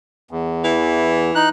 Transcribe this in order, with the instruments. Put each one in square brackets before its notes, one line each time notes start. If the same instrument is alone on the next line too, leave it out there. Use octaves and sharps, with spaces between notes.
[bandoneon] E2
[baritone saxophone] E3
[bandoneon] D#4 F#6